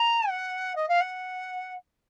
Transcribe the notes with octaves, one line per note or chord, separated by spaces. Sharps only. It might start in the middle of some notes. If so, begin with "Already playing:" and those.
Already playing: A#5
F#5
D#5
F5
F#5